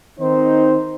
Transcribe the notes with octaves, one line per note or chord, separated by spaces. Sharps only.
D#3 C4 D#4 C5